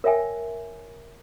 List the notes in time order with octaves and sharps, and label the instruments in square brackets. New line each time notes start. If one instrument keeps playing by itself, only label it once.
[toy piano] A#4 C#5 E5 G5 G#5